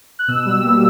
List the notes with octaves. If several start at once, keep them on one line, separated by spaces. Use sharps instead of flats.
F#6
B2 E6
G3
A#3